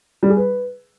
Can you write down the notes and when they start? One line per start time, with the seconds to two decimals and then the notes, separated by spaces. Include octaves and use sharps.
0.23 G3
0.30 G#4
0.37 B4